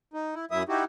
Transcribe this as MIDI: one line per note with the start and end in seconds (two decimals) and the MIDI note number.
0.14 0.35 63
0.35 0.45 64
0.51 0.63 42
0.51 0.63 54
0.51 0.63 64
0.51 0.63 76
0.51 0.63 87
0.69 0.84 63
0.69 0.84 64
0.69 0.84 66
0.69 0.84 67